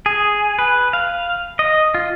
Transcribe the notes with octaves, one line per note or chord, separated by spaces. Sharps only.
G#4
B4
F5
D#5
F4